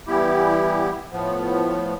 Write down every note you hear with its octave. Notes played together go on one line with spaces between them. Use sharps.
E3 G3 B3 E4 G4
A2 F3 B3